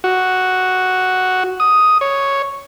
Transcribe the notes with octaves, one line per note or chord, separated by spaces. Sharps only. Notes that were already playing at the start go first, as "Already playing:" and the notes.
F#4
D#6
C#5